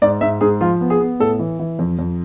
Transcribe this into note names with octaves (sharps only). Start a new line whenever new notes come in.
G#2 D5
G#2 E5
G#2 G#4
F3 F4
B3
G#4
B3
A2 A4
E3
E3
F2
F2